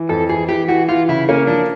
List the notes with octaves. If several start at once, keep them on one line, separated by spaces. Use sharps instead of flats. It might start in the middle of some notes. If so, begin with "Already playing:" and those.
Already playing: E3
F2 A4
E3 G#4
E3 G4
E3 F#4
E3 F4
C#3 E4
A#3 C#4
F3 D4